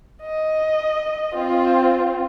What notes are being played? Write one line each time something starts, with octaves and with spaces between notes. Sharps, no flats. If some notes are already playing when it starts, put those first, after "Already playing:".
D#5
C4 F4